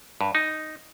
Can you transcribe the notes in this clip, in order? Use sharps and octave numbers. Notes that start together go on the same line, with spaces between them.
G2
D#4